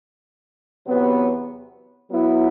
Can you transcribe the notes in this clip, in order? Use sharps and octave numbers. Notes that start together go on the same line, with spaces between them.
E2 C3 F#3 B3
F#3 B3 E4